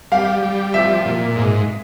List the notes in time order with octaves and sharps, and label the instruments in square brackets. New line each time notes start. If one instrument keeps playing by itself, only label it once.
[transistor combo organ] G3 [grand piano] F5
[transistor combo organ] G3
[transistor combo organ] F3 [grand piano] E5
[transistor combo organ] A#2
G#2